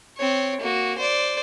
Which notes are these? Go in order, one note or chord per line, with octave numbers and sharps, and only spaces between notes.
C4 C#5
A#3 F#4
C5 D5